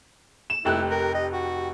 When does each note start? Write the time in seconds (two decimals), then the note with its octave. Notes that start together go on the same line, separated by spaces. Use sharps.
0.50 E7
0.65 F1 E4 G4 F#6
0.91 A#4
1.14 D#5
1.32 F#4